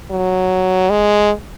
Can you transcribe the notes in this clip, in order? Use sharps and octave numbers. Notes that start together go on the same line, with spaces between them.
F#3
G#3